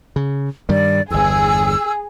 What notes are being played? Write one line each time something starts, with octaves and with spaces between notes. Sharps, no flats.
C#3
G2 D#3 G3 D5
G1 E2 G#4 E6